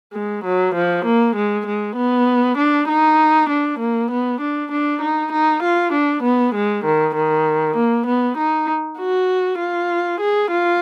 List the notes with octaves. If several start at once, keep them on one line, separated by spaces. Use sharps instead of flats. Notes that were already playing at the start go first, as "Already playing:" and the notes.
G#3
F#3
F3
A#3
G#3
G#3
B3
D4
D#4
D4
A#3
B3
D4
D4
D#4
D#4
F4
D4
B3
G#3
D#3
D#3
A#3
B3
D#4
F#4
F4
G#4
F4